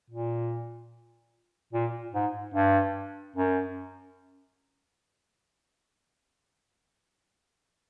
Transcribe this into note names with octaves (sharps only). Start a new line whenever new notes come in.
A#2
A#2
G#2
G2
F#2